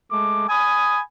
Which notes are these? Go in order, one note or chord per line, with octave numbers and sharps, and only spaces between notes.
G#3 A3 D6
G#5 B5 D#6